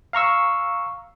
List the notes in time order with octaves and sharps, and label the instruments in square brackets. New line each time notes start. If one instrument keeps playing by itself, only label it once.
[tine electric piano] F5 A#5 C#6 E6